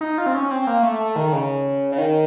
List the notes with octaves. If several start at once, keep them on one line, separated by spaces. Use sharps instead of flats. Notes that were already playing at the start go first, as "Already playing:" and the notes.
D#4
F4
C4
C#4
C4
A#3
A3
A3
D#3
C#3
C#3
D#3